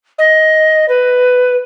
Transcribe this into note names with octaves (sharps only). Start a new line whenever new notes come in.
D#5
B4